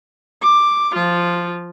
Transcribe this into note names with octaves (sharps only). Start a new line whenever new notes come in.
D6
F3 F4